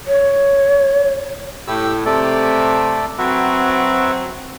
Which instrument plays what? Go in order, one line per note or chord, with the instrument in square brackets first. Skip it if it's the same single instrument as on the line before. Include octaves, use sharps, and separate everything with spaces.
[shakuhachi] C#5
[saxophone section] A2 [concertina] G4 E6
[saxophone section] C3 [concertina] A3 A4 D5
[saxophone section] F#3 C4 [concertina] F#4 B4 E5